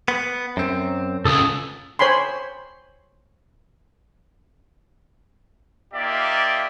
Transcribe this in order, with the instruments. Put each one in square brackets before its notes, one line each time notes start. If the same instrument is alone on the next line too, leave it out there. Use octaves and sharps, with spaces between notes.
[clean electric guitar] B3
F#2 C4
[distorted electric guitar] C#2 [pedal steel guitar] A4 D#6
[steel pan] C5 C#5 G#5 B5 C6
[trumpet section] A#3 D#4 F4 G4 D5 E5